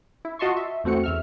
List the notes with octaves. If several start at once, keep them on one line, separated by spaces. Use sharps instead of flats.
E4
F4 F#4 D#5 A5 C6 C#6
E5
E2 A3 C4 F#4 C#7
E2 E5 F6